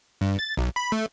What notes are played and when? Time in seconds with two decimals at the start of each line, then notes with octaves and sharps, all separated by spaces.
0.21 G2
0.39 A6
0.57 B1
0.76 B5
0.92 A3